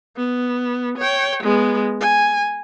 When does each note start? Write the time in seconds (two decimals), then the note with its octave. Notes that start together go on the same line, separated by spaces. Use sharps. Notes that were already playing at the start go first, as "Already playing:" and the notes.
0.16 B3
0.98 C#5 G5
1.43 G#3 B3
2.00 G#5